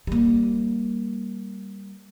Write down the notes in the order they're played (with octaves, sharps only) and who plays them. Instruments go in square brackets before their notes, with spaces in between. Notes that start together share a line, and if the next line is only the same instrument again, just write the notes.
[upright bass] G3 A#3